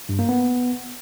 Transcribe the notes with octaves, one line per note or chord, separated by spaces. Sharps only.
G2
A#3
B3